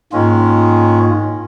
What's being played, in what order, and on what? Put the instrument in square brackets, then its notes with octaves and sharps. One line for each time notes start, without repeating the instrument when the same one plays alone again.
[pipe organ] G#2 A#3 F4 [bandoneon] D#3 G#3 C#4